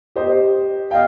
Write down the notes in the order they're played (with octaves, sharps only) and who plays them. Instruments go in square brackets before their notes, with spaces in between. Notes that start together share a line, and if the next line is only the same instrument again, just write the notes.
[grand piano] G4 C5 D#5
[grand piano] D#5 G5 [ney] F5